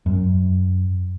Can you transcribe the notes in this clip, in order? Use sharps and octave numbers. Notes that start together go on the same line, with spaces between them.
F#2